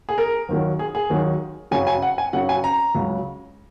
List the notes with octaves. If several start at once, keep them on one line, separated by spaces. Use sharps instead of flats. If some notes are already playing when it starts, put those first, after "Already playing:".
G#4
A#4
D#2 D#3 F#3
G#4
G#4
D#2 D#3 F#3
F#2 C#3 F#3 G#5
G#5
F#5
G#5
F#2 C#3 F#3 F#5
G#5
A#5
C#2 C#3 F#3